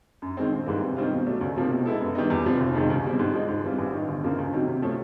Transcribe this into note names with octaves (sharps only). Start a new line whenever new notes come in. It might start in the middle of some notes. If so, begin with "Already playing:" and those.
F#2
D#3 G#3 C4
A#1
G#2 E3 G3 A#3
C3
D#3 G3 C4 F4
B2
F#3 A3 D4
C#2
C3 F3 A#3
B2
G#3 B3 E4 A4
F#2
D#3 G3 B3 D#4
E2
C3 F3
F1
F2 C3 D#3 G#3
C#2
B2 G3 C4
G#2
F3 G#3
G#2
E3 G3 C4 F4
A1
G2 D#3
G1
F#2 C#3 F3 A#3
C#2
C3 D#3 F#3
C3
F3 A3 C#4